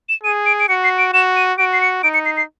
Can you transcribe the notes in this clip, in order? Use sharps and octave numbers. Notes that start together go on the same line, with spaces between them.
E7
G#4 D#7
D7
D7
F#4 C#7
C7
D7
F#4 E7
D#7
F#4 D7
C7
C#7
D#4 D7
C#7
C7
C7